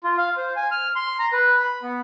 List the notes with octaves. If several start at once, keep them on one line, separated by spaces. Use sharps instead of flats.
F4
F5
C5
G#5
F6
C6
A#5
B4
B5
B3